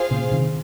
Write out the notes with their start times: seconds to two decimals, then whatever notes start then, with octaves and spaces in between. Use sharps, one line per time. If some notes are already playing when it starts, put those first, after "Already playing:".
Already playing: F4 G#4 C5 F5
0.11 A#2 C#3
0.31 C3 D#3